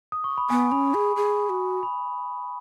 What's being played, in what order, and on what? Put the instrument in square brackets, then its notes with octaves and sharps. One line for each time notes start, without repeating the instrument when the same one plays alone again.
[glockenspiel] D#6
C#6
B5
[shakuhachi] B3 [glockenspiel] G#5
[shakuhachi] C#4 [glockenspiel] B5
[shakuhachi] G#4 [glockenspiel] B5
[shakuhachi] G#4
F#4
[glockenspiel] B5